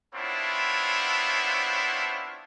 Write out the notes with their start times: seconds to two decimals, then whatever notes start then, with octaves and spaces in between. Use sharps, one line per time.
0.14 B3 C4 D4 E4 F4 C#5